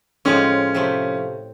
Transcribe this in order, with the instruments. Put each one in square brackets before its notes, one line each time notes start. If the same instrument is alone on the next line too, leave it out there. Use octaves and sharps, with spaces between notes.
[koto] A2 F3 G#3 C4 [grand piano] C#4
[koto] C3 F3 A3 C4